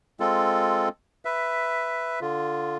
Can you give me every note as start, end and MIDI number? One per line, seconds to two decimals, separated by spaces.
0.20 0.89 56
0.20 0.89 60
0.20 0.89 65
0.20 0.89 69
1.25 2.20 71
1.25 2.20 76
2.21 2.77 50
2.21 2.77 65